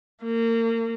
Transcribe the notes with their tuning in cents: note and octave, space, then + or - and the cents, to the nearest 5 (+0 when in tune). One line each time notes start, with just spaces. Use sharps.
A#3 -30